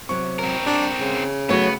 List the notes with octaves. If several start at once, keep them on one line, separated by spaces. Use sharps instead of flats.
C3 F#3 C#6
C4 A#4
D4 G4
C#3
F#3 A3 B3 F#4 C#5